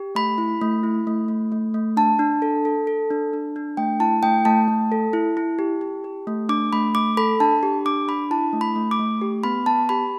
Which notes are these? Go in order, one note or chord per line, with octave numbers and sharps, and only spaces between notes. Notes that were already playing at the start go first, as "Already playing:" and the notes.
Already playing: G4
A3 B5
E4
A3
E4
A3
A3
A3
A3
D4 A5
D4
A4
A4
A4
D4
D4
D4
A3 G5
E4 A5
A3 G5
A3 A5
A3
A4
E4
E4
G4
G4
G4
A3
D4 D6
A3 B5
A3 D6
A4 B5
D4 A5
G4
D4 D6
D4 B5
E4 A5
A3
B5
A3
D6
A3
G4
B3 B5
B3 A5
G4 B5